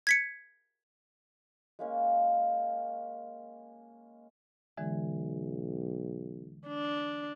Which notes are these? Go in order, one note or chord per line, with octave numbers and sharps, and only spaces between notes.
G#6 B6 C#7
G#3 A#3 C#4
B1 D3 E3 G#3
D4